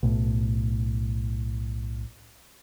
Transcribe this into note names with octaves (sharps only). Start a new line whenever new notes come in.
B1 A2